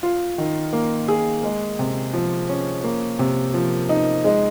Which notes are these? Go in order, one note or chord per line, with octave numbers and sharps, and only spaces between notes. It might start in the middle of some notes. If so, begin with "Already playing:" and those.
F4
D#3
A#3
G#4
G#3
C3
F3
C#4
A#3
C3
F3
D#4
G#3